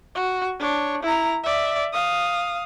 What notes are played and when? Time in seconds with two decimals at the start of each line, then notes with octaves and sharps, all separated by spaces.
0.15 F#4
0.59 D4 C#5
1.03 E4 A#5
1.44 D5 E5
1.93 F5 D#6